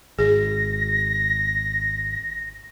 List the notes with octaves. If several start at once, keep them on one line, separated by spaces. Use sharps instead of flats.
G#1 G#4 A#6